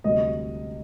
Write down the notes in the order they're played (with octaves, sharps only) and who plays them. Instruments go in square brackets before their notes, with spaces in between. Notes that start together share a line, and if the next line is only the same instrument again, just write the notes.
[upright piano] D2 C3 G3 D#5